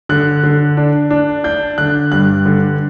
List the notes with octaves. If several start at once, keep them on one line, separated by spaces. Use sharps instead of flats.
D3 F#6
D3
D4
D4
D4 G6
D3 F#6
G2 F#6
D3